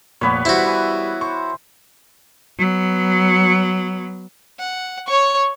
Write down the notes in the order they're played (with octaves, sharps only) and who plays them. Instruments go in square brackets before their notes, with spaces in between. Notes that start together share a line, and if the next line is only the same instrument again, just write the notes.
[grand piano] F1 A#2 [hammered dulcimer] B3 B4 C#5
[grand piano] G3 C5 [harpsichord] E4 F#4
[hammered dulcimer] E3 G#5
[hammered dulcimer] C5 [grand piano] C#6
[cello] F#3 B3
[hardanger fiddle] F#5
C#5 C#6